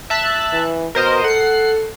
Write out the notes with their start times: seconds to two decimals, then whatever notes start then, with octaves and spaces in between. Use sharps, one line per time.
0.10 E5 A5 F#6
0.53 E3
0.95 B2 A#4 C5 D#5
1.24 A4 F#5 C7